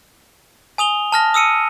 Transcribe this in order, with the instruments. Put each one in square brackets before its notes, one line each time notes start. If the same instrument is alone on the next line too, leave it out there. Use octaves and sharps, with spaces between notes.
[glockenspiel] G#5 D#6 F7 G7
A5 F6 A#6
D#6 E6 C#7 D#7